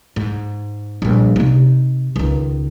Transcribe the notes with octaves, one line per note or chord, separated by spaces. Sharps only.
G#2
A#1 G3
C3 D#4
C#2 D#3